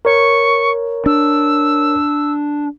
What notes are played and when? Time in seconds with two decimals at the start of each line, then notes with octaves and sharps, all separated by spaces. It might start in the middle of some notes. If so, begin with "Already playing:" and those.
0.05 A#4 C#5 C#6
1.06 D4 E6